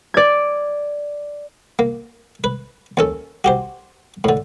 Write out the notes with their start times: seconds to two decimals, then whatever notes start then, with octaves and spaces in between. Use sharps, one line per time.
0.14 D5 G#6
1.79 A#3
2.44 B4
2.97 D#2 C#4 A4
3.44 F#4 G4 C5
4.24 A2 D3